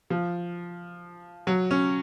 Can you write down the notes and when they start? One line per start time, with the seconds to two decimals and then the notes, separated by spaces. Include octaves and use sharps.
0.10 F3
1.47 F#3
1.71 C#4